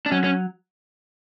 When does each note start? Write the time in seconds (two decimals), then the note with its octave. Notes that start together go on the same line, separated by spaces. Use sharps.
0.06 D4
0.12 F#3 C#4
0.24 C#4